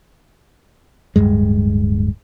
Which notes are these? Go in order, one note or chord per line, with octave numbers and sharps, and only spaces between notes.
D1 C#2 G2 G#3